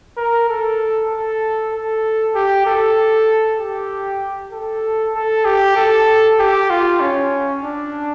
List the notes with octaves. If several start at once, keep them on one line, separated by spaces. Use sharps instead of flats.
A#4
A4
A4
A4
G4
A4
G4
A4
A4
G4
A4
G4
F4
C#4
D4